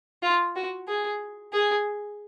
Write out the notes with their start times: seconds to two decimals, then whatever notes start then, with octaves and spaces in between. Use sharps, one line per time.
0.23 F4
0.56 F#4
0.88 G#4
1.53 G#4